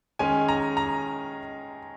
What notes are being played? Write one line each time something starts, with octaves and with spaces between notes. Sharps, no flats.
D#3 G#3 C#4 G#5
A#5
A#5